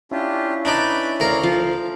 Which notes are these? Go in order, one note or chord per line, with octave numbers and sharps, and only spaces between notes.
C#4 D4 E4 F4 G4
D4 D#4 B4 D5 B5 D6
D2 A#4 C#5 D5 F5
F3 F5